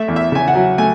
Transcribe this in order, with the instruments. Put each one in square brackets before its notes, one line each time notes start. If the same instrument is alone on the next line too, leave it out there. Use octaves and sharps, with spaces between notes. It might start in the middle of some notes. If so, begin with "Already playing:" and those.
Already playing: [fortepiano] A3 E5
E2
E5
C#3 G#5
F#5
F#3
A3 G#5